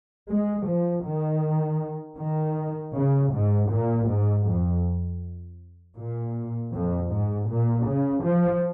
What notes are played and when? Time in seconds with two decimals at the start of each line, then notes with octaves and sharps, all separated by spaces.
0.30 G#3
0.67 F3
1.05 D#3
2.18 D#3
2.94 C#3
3.33 G#2
3.70 A#2
4.08 G#2
4.46 F2
5.97 A#2
6.73 F2
7.11 G#2
7.49 A#2
7.86 C#3
8.24 F3